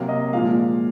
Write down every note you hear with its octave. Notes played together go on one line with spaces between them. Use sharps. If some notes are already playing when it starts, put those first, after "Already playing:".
Already playing: C3 F#3 A#3 F5
D#5
A#2 F3 G#3 F5